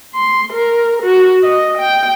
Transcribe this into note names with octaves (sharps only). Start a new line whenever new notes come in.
C6
A#4
F#4
D#5
G5